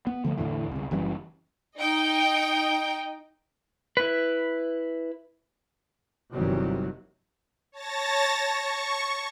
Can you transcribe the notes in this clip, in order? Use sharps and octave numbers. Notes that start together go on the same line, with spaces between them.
B3
D3 F3 A3
E2 A2 D3 E3
C2 C#3
F#1 E3 G3 C#4
D#4 D#5 G5
E4 B4
G1 C3 D#3 E3 F#3 G3
C#5 A5 A6 A#6
C#6